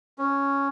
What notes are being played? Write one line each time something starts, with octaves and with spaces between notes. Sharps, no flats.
C#4